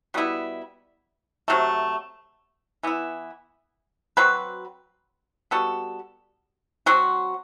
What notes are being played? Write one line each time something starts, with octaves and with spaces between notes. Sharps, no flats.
B2 G3 B3 E4
C3 F#3 A3
E3 B3 E4
F#3 C4 F#4 B4
G3 B3 F#4 A4
F#3 C4 F#4